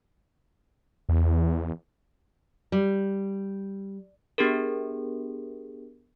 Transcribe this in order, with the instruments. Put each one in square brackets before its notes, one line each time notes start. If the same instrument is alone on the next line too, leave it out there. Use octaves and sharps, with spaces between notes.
[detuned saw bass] E2
[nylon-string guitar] G3
[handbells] B3 D4 G4 G#4 A#4